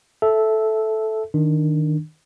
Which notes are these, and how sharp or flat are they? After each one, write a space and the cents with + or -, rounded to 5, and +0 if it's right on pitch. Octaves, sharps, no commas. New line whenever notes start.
A4 -10 E5 +0
D#3 +0 D4 +5